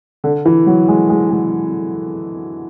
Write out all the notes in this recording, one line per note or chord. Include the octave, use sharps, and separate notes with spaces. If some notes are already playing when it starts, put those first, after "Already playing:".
D3
E3
F#3
G#3
G#3
G#3